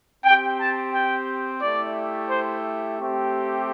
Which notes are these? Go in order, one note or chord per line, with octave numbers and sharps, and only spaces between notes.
C4 G5
G4
A5
G5
A3 E4 G4 D5
C5
A3 C4 G4